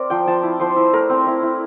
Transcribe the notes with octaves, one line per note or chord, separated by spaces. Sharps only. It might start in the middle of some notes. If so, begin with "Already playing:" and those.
Already playing: C4 A#4 D5
F3 G5
F3 A5
E4
F3 C5
E4
A3 A#4
C4
E4
E4